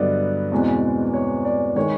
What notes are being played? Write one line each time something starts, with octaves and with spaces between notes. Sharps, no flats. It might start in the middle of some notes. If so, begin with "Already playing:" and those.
Already playing: G2 D3 F#3 B3 D5 D#5
E2 B2 G#3 C4
C#5
D5
D#3 G#3 C#5